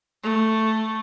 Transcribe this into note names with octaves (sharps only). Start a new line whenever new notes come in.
A3